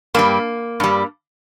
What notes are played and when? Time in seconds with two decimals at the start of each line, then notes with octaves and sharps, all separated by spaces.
0.14 G2 G3 A#3
0.80 G2 G3